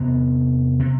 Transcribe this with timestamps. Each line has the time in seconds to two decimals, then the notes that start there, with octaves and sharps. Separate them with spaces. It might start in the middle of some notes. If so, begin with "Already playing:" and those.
Already playing: E2 C3 B3
0.79 C3